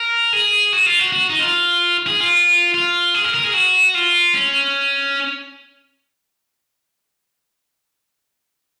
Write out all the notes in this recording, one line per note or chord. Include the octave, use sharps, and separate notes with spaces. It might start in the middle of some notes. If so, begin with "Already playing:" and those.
Already playing: A#4
G#4
F#4
F4
F#4
F#4
D#4
F4
G#4
F4
F4
G#4
A#4
A#4
G#4
F#4
F4
C#4